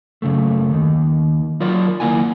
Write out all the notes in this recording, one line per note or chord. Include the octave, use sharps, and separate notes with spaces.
F#2 C#3 A3
D#2 D#3
F#3 F4 A#4 D5
D#2 F3 A#3 E4 F#5 G#5